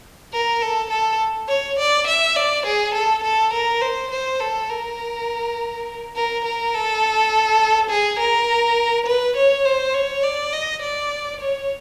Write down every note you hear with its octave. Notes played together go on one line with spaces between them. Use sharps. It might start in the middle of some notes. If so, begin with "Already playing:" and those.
A#4
A4
A4
C#5
D5
E5
D5
G#4
A4
A4
A#4
C5
C5
A4
A#4
A#4
A#4
A4
G#4
A#4
B4
C#5
C5
C#5
D5
D#5
D5
C#5